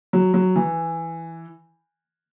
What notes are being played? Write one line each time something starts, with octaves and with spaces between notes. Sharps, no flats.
F#3
F#3
E3